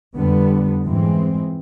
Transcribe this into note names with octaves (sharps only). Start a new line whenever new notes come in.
F2 D3 G3 B3
G#2 E3 G#3 C4